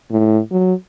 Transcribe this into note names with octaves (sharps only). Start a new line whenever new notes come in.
A2
F#3